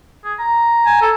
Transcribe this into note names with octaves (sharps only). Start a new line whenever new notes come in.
G#4
A#5
G#5
A4